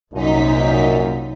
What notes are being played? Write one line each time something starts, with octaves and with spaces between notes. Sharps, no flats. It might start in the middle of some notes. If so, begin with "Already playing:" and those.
C2 F#2 A#2 D#4 B6